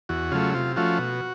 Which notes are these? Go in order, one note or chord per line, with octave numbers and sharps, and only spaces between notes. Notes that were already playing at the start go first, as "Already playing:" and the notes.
E2 F#4
C#3 F#3 A3 F4
C3 F4
F3 A3 C#4 F4 F#4
B2